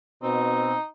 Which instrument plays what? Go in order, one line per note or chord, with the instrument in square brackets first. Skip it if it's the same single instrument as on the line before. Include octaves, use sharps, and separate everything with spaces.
[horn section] B2 C4 [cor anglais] D#4